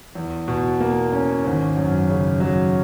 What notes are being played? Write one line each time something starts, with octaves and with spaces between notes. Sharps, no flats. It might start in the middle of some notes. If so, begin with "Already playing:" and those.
E2
B2
A#3
C#4
G#1
F#2
C#3
F#3